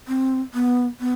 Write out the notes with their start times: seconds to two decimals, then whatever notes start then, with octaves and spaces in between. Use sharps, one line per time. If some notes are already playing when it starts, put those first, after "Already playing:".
0.08 C4
0.54 B3
1.00 B3